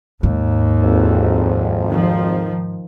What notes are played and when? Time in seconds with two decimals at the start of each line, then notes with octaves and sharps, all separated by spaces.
0.23 D#2 G#2
0.82 G#1 F2
1.87 D#3 F3